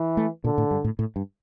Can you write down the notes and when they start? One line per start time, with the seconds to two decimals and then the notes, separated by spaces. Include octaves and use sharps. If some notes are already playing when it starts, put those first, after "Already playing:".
Already playing: E3
0.17 A3
0.44 A#2 D3
0.58 A2
0.71 G2
0.84 A2
0.99 A2
1.16 G2